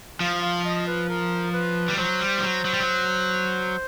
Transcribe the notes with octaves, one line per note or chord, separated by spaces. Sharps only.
F3 F5
F5
D#5
B4
A#4
B4
G3
F#3 C5
G3
F3
F#3
F#3
G3
F#3